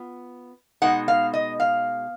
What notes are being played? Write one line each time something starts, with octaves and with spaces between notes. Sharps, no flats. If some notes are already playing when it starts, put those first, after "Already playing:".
Already playing: B3 F4
B2 G#3 D#4 F#5
F5
D#5
F5